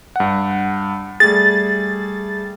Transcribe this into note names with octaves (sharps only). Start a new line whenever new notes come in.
G2 F#5
G3 A3 G#4 A6